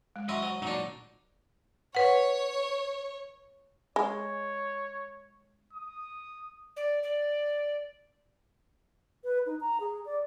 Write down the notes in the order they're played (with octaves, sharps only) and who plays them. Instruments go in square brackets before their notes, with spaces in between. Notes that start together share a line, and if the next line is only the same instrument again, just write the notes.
[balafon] G#3
[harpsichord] F#3 C#4 E4 [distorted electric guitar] D#5 [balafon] C6
[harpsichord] F#3 [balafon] C5
[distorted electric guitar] A#2 D#4 [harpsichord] F#3 D4
[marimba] B4 F#5 [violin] C#5
[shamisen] G#3 [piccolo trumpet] C#5
[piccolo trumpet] D#6
[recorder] D5
D5
[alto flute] B4
D#4
A#5
G#4
D5